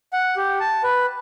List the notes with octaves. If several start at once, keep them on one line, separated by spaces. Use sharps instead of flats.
F#5
G4
A5
B4